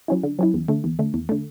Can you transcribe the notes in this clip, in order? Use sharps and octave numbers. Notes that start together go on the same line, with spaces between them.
F#3 C#4 E4
D3
F#3 C#4 E4
E2
D3 A3
E2
D3 A3
E2
D3 A3